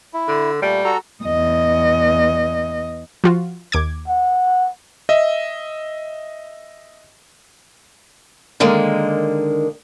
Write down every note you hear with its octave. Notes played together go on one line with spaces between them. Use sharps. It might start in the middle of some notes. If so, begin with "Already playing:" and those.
E4
D3
A#2 G3 A3
F#4 A4 A#5
E2 D#5
F3 F4 F#4
D#2 D6 G#6
F#5
D#5 E5
D3 D#3 G#3 A#3